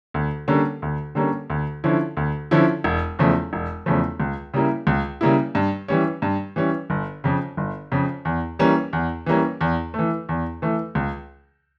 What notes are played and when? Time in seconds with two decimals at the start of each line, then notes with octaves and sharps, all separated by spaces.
0.14 D2
0.48 D3 G3 A#3 C#4
0.82 D2
1.15 D3 G3 A#3 C#4
1.50 D2
1.84 D3 F3 C#4 E4
2.17 D2
2.51 D3 F3 C#4 E4
2.84 E1
3.19 E2 C#3 F3 A3
3.53 E1
3.86 E2 C#3 F3 A3
4.20 C#2
4.54 C#3 G3 A#3 E4
4.87 C#2
5.21 C#3 G3 A#3 E4
5.55 G2
5.88 E3 G3 C#4
6.22 G2
6.56 E3 G3 C#4
6.90 G1
7.24 F2 C#3
7.57 G1
7.92 F2 C#3
8.25 E2
8.59 E3 G3 A#3 C#4
8.93 E2
9.26 E3 G3 A#3 C#4
9.61 E2
9.94 E3 A3
10.29 E2
10.62 E3 A3
10.95 C#2